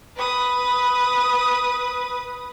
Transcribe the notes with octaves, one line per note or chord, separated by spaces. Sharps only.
B4 D#6